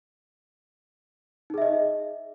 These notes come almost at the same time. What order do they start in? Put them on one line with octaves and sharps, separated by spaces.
D#4 G#4 E5 D#5